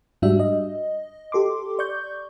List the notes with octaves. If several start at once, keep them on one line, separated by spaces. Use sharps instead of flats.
G#2 G3 D4 F#4 E5
D#5
G4 A4 C6 D6
D5 C#6 G6